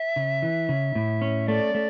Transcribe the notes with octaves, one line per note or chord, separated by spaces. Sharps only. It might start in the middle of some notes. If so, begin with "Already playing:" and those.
Already playing: E5
C#3
E3
C#3
A2
C#4
A3 D5
A3